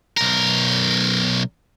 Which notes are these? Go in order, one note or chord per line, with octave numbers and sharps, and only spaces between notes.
B1 A#4